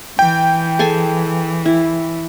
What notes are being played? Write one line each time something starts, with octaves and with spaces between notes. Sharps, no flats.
E3 G5
G#4 A4 G#5
E4